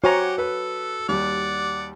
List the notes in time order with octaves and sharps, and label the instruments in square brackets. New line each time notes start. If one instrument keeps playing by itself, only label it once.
[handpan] F#4 [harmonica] G4 F#5 [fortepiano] C5 G#5 A#5 [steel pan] C#5
[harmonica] A4 [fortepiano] B4
[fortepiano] D#2 G3 [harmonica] D5 F#5